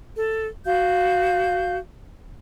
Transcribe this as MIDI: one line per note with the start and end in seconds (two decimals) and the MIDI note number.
0.17 0.48 69
0.66 1.77 66
0.66 1.77 77
0.66 1.77 91